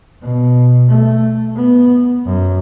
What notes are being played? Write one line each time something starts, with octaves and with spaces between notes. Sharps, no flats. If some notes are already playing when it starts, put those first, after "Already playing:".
B2
A3
B3
F#2